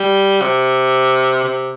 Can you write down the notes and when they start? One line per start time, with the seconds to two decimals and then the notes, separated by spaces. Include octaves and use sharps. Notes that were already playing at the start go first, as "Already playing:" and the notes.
Already playing: G3
0.41 C3
1.44 C3